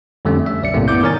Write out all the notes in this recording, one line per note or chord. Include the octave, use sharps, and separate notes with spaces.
F2 D3 G3 A3 C#4
E5
B1 D5 C#7
F#2 A2 C3 A3 A#3
B3 E4 D5 D6 G6
D#3 A#4 C#5 G#5 A6